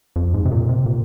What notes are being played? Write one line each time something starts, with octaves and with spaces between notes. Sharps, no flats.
F2
G#2
C3
A#2
C3
A#2